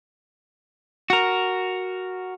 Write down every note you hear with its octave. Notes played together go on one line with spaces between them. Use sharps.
F#4 A#4